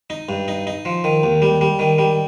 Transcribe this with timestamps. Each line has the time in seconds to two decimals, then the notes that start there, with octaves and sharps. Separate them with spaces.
0.10 D#4
0.29 G2
0.48 D#4
0.67 D#4
0.85 F3
1.04 D#3
1.23 D#2
1.42 G3
1.61 G3
1.79 D#3
1.98 G3